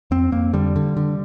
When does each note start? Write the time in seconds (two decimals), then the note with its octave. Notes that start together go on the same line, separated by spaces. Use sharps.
0.11 F2 C4
0.32 F2 A#3
0.53 D3 G3
0.76 D3
0.97 D3